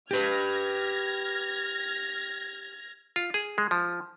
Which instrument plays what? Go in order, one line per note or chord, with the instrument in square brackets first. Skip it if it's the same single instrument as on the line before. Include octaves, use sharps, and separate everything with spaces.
[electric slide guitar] G4 B4 [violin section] F6 G#6 A#6
[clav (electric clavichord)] F4
G#4
G#3
F3